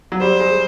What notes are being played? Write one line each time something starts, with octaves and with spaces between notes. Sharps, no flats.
F#3
G3 C5
G#3